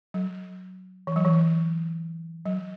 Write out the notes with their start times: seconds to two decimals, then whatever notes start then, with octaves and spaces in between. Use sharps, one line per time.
0.14 F#3
1.07 E3
1.16 F#3
1.25 E3
2.46 F#3